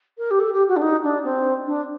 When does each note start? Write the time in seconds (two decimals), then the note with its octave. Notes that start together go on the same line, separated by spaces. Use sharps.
0.18 A#4
0.30 G4
0.39 A4
0.53 G4
0.68 F#4
0.76 D4
0.81 D#4
1.03 D4
1.24 C4
1.66 D4